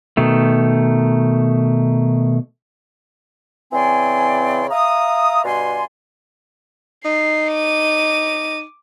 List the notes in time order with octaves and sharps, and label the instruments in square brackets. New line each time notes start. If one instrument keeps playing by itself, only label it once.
[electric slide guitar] B2 D#3 A3
[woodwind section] C#3 E3 C4 D5 G#5 C6
E5 F5 A#5 D#6
G2 B2 D5 G#5 C6
[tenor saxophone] D#4 [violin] C7
[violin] D6 D#7